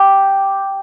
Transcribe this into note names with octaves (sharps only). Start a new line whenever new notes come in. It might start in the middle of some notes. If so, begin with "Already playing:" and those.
Already playing: G4